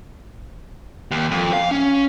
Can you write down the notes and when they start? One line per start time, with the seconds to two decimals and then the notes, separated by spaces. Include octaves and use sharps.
1.11 D#2
1.31 F2
1.53 F5
1.71 C#4